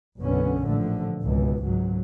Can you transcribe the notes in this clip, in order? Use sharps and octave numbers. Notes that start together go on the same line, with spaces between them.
F#1 B1 D3 B3 C#4
A1 A#2 D3 F3 A3
G#1 C#2 B2 E3
C#2 G#2 F#3